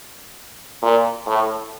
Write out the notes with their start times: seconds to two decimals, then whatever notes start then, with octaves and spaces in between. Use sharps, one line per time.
0.82 A#2
1.26 A2